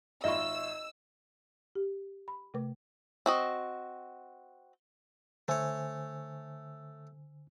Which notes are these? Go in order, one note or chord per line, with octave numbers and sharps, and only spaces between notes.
G#1 F4 D#5 E5 B5 C#6 E6
G4
B5
C3 A3 B4 D6
C4 F#4 D#5
D3 A3 C5 C#5 G#5